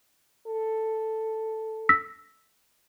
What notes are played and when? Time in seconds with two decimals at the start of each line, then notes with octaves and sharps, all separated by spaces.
0.47 A4
1.89 E6 A#6 B6